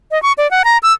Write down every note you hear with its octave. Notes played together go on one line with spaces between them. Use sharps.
D#5
C#6
D5
F#5
A#5
E6